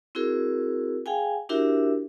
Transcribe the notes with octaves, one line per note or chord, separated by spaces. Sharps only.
C4 E4 F#4 G#4 A#4
G#4 F5 G5 G#5
D4 E4 F#4 G4 A#4 E5